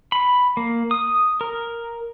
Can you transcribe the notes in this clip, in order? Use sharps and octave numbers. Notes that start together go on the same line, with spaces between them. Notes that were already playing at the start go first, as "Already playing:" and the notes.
B5
A#3
D#6
A#4